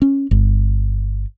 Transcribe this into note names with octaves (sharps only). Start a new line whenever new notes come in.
C#4
G1